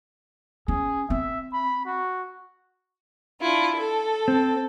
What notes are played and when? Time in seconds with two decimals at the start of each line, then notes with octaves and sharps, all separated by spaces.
0.68 C#4 G#4
1.10 C4 E5
1.53 B5
1.86 F#4
3.41 D4 E4 F4
3.75 A4
4.28 C4